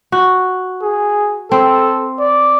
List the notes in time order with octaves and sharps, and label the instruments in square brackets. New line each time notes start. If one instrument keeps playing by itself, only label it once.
[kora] F#4
[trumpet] G#4
[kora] C4 [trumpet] A4
[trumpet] D5